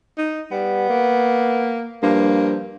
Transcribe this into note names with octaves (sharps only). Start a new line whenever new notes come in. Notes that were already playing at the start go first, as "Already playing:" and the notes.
D#4
G3 B3
A#3
G2 F3 A#3